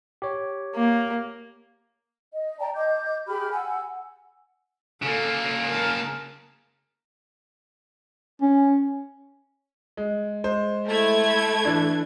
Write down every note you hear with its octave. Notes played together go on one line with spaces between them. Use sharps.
G4 C#5
A#3
D#5
D5 G5 A5 A#5
D#5 D6 G6
G4 G#4 B5 F6
F#5 G#5 E6
C#3 A#3 A4
A#4 A5
C#4
G#3
G#3 C5
A3 E4 G#6
E3 D4